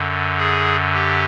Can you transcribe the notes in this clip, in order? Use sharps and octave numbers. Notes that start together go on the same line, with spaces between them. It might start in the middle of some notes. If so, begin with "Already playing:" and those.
Already playing: F#2 D3
G#4
G4